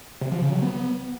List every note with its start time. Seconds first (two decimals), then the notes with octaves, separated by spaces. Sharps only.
0.21 C3
0.32 F3
0.42 C#3
0.52 F#3
0.62 B3